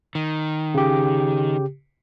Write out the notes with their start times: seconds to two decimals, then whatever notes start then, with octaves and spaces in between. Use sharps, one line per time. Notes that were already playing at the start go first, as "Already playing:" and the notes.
0.15 D#3
0.74 C#3 G4